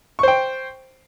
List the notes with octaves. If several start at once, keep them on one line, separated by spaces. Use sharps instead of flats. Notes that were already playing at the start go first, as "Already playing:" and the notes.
C5 G5 C#6